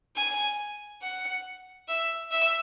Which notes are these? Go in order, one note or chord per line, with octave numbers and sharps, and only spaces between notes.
G#5
F#5
E5
E5